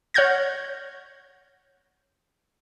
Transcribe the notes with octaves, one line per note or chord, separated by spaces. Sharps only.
C#5 F#5 F6 G6 G#6 A#6